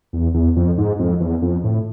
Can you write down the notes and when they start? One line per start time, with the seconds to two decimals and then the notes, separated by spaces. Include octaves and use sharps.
0.13 E2
0.34 E2
0.56 F2
0.78 G#2
0.99 F2
1.20 E2
1.42 F2
1.64 A2